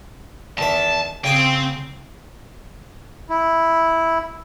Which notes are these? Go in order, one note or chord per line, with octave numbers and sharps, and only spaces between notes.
E2 D#3 E5 A5
C#3 C4 G5 G#5 D#6
E4